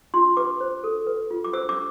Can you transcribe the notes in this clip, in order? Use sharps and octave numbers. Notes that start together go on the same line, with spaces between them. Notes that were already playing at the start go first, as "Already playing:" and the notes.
F4 C6
B4 D6
C5
A4
B4
F4
D6
C5 E6
D6